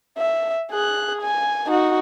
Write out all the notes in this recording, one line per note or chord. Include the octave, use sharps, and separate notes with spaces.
E5
G#4 F#6
G#5
D#4 F#4